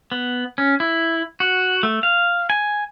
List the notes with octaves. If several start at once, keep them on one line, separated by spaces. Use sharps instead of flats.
B3
C#4
E4
F#4
A3
F5
G#5